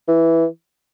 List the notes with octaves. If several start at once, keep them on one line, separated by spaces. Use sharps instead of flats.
E3